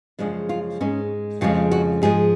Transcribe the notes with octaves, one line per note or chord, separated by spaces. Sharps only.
F#2 C#3 F3 G#3 D4
F4
G#2 G#3 C#4
F2 C#3 F3 G#3 F4
F#4
G#2 F3 G#3 G#4